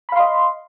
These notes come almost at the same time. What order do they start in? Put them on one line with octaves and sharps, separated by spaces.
B5 F5 C6 D#5